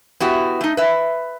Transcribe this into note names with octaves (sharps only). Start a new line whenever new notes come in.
B3 E4 F#4 G4
A3 D#4
B4 E5